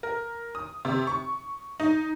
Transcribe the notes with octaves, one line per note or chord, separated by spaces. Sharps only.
A#4
D#6
C3
C#6
D#4